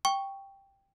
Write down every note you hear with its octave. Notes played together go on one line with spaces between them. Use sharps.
G5 C#6